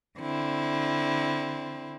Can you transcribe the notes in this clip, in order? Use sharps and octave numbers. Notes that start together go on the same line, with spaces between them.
D3 C4 E4